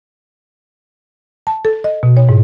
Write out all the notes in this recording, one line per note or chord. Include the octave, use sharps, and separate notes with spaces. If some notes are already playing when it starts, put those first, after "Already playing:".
A5
A4
D#5
B2
C#5
G#2